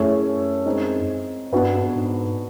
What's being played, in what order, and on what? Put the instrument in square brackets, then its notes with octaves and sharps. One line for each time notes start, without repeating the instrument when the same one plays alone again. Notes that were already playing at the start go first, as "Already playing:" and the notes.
Already playing: [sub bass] F#2 [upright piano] A3 C#4 E4 G#4 C#5
[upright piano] G#3 C4 D#4
[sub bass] G2 [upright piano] B3 D4 F#4 B4
[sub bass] G#2